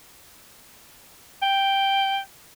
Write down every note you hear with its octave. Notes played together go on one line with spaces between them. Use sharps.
G5